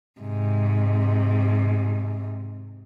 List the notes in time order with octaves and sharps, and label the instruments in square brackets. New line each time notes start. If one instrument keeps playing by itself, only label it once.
[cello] G#2 C3